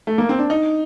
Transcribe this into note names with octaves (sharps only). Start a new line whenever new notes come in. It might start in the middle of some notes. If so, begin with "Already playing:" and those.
A3
A#3
C4
D4
D#4